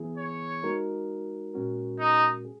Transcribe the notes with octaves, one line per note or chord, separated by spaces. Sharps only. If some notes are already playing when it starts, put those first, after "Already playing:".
Already playing: E3 B3 E4 G#4
C#5
G#3 D#4 F#4 A#4
A#2 G#3 C#4 F#4 A#4
D#4
G#4